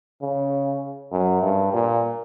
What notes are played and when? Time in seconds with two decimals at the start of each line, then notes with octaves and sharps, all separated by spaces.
0.22 C#3
1.12 F#2
1.42 G2
1.73 A#2